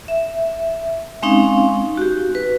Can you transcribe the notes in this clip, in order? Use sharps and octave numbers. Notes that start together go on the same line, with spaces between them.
E5
G#3 C4 C#4 D#4 F5
F#4 G4
B4